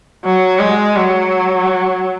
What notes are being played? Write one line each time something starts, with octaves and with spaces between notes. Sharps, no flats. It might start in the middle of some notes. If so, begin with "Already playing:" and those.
F#3
G#3
F#3